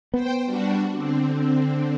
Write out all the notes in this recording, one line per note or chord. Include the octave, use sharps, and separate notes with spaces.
B3 C5 G5
G3 D4 F#4
D3 C4